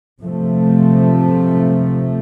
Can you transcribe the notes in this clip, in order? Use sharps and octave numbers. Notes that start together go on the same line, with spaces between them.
C3 F3 A3